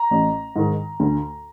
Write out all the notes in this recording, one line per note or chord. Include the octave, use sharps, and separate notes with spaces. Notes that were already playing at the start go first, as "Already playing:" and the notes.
Already playing: A#5
A1
G#2 D#3
D2